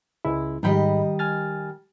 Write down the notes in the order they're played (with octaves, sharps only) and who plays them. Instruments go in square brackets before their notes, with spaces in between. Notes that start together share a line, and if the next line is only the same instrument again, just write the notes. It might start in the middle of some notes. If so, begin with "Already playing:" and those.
[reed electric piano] C#2 G#3 E4
[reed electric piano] G#2 G5 B5 [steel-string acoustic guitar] D#3 G3 D#5
[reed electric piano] G#5 F6 A6